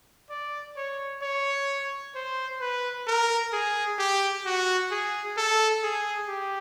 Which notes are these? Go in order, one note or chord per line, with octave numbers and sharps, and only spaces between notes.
D5
C#5
C#5
C5
B4
A#4
G#4
G4
F#4
G#4
A4
G#4
G4